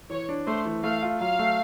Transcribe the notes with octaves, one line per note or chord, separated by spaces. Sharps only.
E3 C#5
D4
A3 C5
E3
A3 F5
F4
F#3 F5
A3